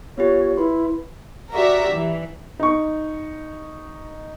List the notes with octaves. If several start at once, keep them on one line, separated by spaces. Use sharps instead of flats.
B3 F4 G4 C#5
E4 B4 C6
F#4 G4 A#4 D5 E5
E3
D#4 C#6